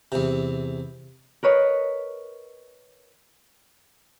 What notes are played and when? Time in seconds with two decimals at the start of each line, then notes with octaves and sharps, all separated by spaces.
0.12 E2 C3
1.43 A#4 B4 C#5 D#5